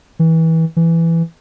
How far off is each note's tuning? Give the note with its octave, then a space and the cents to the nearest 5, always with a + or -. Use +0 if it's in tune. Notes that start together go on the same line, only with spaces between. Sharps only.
E3 -25
E3 +10